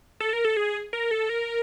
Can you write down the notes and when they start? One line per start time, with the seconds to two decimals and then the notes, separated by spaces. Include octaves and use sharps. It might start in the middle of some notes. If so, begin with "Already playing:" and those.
0.20 A4
0.33 A#4
0.45 A4
0.57 G#4
0.93 A#4
1.11 A4
1.29 A#4